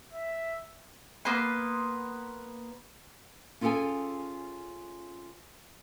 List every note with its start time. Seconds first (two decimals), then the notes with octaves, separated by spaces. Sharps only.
0.13 E5
1.25 A#3 B3 B4 C6
3.61 C#4 F4 G#4 A4 G5 G#5